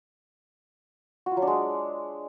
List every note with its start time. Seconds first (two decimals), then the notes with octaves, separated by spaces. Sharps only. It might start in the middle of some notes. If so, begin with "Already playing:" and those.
1.26 F#4
1.32 F4
1.37 F#3
1.42 D4
1.47 G#3